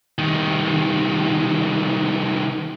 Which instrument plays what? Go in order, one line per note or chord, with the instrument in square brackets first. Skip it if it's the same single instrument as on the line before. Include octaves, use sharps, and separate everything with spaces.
[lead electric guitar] C2 D#3